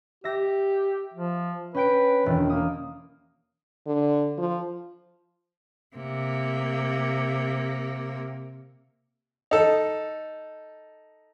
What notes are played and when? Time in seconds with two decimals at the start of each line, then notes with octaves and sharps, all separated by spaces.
0.24 G4 E5 A#6
1.14 F3
1.74 C#4 B4 G5 D7
2.26 E1 D#3
2.50 A#3 D#6
3.87 D3
4.38 F3
5.96 C3 A#3
9.51 D#4 A4